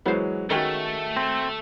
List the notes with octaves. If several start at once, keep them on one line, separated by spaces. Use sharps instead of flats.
E3 F#3 G#3 B3 C5
D#3 G#3 A3 C#4 F#4 G5 G7
C4